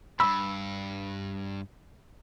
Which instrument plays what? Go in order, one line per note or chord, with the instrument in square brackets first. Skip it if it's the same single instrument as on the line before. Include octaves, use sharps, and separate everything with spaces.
[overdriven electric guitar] E2 G2 [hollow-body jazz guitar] B5 [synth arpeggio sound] E6